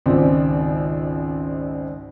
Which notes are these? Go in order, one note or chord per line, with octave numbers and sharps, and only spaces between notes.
G#1 C#2 C4 D5